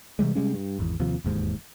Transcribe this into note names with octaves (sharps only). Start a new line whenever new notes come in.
C3 E3 G3 G#3
C3 G3 G#3 C#4
G2
G#1 E2
D#2 C3 F3
E1 D#2 G#2